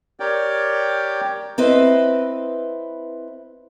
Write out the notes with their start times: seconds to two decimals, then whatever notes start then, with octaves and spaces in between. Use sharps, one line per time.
0.20 G4 A#4 C#5 D5 G5
1.58 C4 E4 B4 D#5